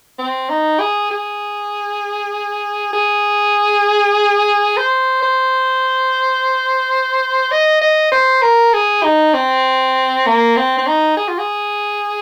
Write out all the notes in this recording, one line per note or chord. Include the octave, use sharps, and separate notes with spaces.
C4
D#4
G#4
G#4
G#4
C5
C5
D#5
D#5
C5
A#4
G#4
D#4
C4
A#3
C4
C4
D#4
G#4
F4
G#4